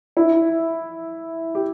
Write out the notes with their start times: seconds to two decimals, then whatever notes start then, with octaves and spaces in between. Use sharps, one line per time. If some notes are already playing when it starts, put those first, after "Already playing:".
0.17 E4
1.55 G4